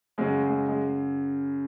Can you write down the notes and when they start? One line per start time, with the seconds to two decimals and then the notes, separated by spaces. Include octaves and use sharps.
0.18 F#2 C#3 F#3 G#3
0.49 G#3
0.69 G#3